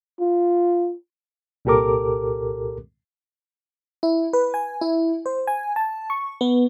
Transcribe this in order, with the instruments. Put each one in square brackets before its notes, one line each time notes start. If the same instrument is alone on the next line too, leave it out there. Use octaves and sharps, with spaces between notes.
[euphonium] F4
[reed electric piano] C2 A#2 G4 A4 A#4 D6
[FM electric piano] E4
B4
G#5
E4
C5
G#5
A5
C#6
B3